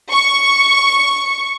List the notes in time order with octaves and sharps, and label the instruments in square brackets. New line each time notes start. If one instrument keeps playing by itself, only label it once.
[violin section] C#6